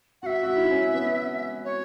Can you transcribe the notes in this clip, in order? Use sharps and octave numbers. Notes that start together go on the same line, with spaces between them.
F#4 E5 F#5
F#4
E4
C#4
B3
C#5